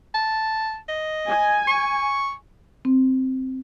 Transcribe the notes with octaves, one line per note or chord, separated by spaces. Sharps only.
A5
D#5
G#5
C#6
C4